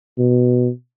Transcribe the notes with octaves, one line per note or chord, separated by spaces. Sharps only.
B2